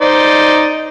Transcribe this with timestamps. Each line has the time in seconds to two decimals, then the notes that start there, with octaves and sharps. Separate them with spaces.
0.01 D#4 C5 D5